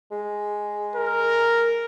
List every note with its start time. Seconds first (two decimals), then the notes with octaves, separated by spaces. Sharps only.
0.12 G#3
0.96 A#4